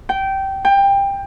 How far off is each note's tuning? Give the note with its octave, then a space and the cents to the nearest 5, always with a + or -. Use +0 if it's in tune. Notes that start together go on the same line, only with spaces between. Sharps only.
G5 -15
G5 +20